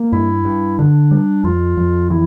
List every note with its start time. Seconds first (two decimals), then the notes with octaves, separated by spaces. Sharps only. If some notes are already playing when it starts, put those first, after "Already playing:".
Already playing: A#3
0.12 G2 E4
0.45 G2
0.78 D3 D4
1.11 G3
1.44 F2 F4
1.77 F2
2.10 E3 E4